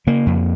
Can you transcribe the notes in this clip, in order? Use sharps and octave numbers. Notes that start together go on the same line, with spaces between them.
C#3 A#3
F2